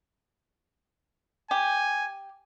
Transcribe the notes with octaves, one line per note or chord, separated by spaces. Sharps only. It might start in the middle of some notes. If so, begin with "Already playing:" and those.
G4 G#5